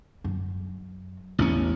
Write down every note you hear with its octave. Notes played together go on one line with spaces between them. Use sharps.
F#2
A1 E2 C#4